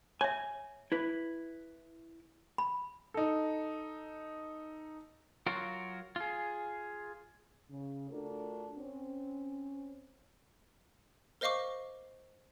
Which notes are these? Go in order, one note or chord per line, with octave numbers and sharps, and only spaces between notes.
C#5 E5 G#5
E4 B4
B5
D#4 A4
F#3 F4 F#4 A#4
F4 G#4
C#3
A3 D4 F4 F#4 A4 A#4
C4 C#4
A#4 C5 D#5 F5 C#6 D6